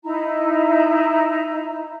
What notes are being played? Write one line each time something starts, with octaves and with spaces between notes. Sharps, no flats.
D#4 E4 A#5